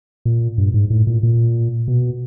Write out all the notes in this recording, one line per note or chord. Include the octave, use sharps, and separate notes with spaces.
A#2
G2
G#2
A2
A#2
A#2
B2